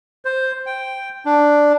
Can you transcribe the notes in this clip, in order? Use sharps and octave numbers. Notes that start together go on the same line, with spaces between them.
C5
G5
D4